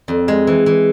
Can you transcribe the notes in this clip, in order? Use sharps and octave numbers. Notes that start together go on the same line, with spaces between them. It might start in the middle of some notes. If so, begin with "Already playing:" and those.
F2
G#3
E3
E3